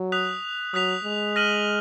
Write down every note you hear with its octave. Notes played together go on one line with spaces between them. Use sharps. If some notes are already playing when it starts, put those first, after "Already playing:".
Already playing: F#3
D#6 F#6 B6 F7
F#3 D#6 F#6 B6 F7
G#3
F6 A#6 D#7 F#7